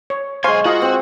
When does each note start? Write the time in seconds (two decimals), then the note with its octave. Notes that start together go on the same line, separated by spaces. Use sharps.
0.10 C#5
0.44 B1 G#3 C5 F5 G#5 C6 C#6
0.66 F4 F#4 D#5 F5
0.82 C4